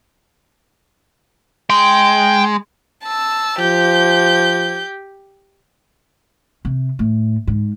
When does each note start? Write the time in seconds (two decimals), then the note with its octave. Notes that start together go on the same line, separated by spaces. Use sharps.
1.70 G#3 G5
3.04 A5 E6
3.59 F3 G4 G6
6.65 C3
6.99 A2
7.47 G#2